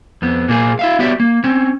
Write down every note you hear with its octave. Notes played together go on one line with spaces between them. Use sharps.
F2 B3
A#2 A#3 G#4
E4 E5 F5
B3 F#4 G4 C#5 D5 E5
A#3
C4 C#4